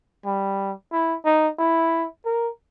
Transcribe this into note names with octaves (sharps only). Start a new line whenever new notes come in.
G3
E4
D#4
E4
A#4